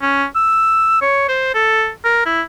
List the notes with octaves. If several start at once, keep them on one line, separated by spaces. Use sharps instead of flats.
C#4
E6
C#5
C5
A4
A#4
E4